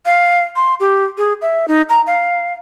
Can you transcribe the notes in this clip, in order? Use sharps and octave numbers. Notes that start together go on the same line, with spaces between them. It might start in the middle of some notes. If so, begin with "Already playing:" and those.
F5
C6
G4
G#4
E5
D#4
A#5
F5